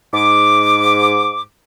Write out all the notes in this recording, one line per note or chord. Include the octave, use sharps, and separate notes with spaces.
G#2 D6